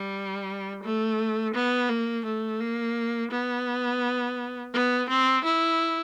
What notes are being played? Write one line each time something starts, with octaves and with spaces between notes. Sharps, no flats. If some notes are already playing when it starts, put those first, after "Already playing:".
Already playing: G3
A3
B3
A#3
A3
A#3
B3
B3
C4
E4